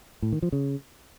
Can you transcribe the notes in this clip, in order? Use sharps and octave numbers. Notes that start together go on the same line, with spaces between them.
A2
D#3
F3
C#3